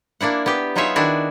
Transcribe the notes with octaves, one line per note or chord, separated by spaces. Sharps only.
A#3 D4 E4 F#5
B3 G4
F#3 D#4 F4 G#4 C#5 E5
D#3 D4 E4 F#4